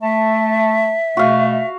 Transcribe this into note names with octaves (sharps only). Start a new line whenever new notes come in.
A3 E5 A5
B2 A3 F#4 F5